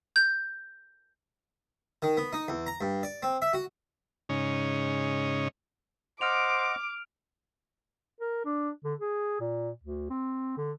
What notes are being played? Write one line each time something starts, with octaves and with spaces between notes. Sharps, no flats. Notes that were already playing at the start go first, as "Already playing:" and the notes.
G6
D#3
B3
D#4
E2
A#5
G2
D5
C4
E5
F#4
G#2 C#3 C#4 D#4
C5 D#5 F#5 D6 F6 D7 F7
A#4
D4
D3
G#4
A#2
D2
C4
D3